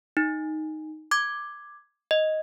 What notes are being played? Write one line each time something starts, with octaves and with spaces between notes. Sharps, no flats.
D#4
D6 G#6
D#5